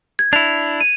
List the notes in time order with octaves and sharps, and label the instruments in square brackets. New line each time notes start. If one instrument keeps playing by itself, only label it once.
[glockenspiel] G#6
[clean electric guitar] D4 E4 [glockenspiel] F7
[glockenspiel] D#7